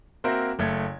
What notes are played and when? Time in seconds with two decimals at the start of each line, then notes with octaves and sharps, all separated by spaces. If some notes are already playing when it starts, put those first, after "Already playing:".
0.24 A#3 C4 F#4 A#4 C5 E5
0.59 F#1 A3 G#6